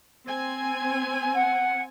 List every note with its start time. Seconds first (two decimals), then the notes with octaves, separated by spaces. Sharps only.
0.25 C4 G#5
1.35 F#5